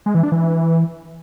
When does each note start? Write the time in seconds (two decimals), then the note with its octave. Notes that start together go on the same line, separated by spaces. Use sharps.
0.06 G#3
0.15 E3
0.23 D4
0.32 E3